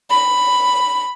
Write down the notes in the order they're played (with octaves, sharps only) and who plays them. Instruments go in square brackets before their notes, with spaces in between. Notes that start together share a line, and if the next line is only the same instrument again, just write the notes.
[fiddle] B5